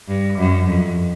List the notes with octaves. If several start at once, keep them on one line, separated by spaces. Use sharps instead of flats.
G2
F#2
F2